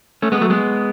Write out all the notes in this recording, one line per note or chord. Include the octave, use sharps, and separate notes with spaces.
A3 C#4
G#3 B3
F#3 A3
G#3 B3